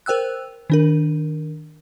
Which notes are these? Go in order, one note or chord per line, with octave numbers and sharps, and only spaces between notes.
A#4 C5 G5 E6 F#6
D#3 D4 A#4